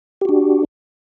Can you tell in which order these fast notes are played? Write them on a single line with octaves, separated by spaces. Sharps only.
G4 F#4 D4